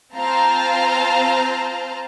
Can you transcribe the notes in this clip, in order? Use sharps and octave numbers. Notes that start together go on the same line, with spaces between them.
C4 F4 C5 F5 A5 A#5